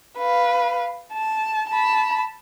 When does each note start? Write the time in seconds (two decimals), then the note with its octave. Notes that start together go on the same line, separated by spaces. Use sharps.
0.18 B4 F5
1.13 A5
1.70 A5 B5